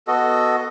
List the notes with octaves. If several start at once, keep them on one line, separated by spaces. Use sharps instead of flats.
B3 F#4 A4 D#5